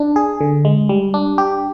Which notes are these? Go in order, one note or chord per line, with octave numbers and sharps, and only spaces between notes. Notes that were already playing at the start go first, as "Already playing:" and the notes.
Already playing: D4
G#4
D3
G#3
G3
D4
G4